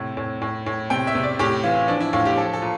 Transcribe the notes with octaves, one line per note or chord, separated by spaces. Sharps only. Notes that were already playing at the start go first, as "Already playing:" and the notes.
Already playing: A2 C3
A2
A2
A2
C3 G5
E5
C3
D5
A2 G4
E3 F4
F3 D4
E4
A2 F4
G4
F3 A4
A4
A#2